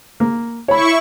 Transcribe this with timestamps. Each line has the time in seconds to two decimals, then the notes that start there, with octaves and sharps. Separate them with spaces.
0.20 A#3
0.68 E4 C#5 B5 C#6